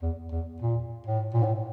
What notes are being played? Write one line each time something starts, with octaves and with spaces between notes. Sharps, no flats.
E2
E2
A#2
A2
A#2
A2